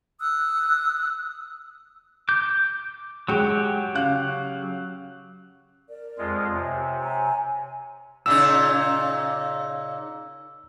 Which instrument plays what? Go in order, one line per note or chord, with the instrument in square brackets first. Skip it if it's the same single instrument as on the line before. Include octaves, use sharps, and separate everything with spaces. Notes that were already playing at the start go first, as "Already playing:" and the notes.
[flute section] D#6 E6 F#6
[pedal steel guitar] D6 G6
[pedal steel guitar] F#3 F#4 G4 [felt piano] G#3 G5
[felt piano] C#3 F5 F#6
[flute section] A#4 D5
[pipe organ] F2 G#3 F4
[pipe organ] C3 [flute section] C#5 G#5
[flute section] C#5 G#5 A#5
[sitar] A#2 C#3 D#4 [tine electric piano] E6